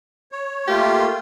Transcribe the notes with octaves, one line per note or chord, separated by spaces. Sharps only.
C#5
A3 A#3 F4 G4